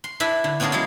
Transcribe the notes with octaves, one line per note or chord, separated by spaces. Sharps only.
C6
D4 E4 B4 E5
D3
B3 C#4 D4 F4 G#4 A#4
F#3 G#3 E4 F4